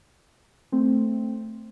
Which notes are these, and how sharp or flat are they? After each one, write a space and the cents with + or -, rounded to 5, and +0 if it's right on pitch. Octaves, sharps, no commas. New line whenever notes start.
A3 +0 C4 +0